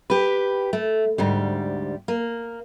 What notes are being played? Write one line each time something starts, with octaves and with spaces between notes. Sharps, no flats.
G4 B4
A3
D2 G#2 G3
A#3